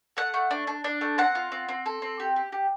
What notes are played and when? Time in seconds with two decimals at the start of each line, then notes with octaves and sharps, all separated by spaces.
0.17 A3 F#5
0.34 A3
0.51 D4
0.67 D4
0.84 D4
1.01 A3
1.18 C4 F#5
1.35 F4
1.52 C4
1.68 C4
1.86 A4
2.02 C4
2.20 G4
2.36 G4
2.52 G4